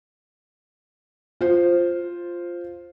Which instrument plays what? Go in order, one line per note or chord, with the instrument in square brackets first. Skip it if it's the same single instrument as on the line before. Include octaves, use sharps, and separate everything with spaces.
[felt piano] F4 C5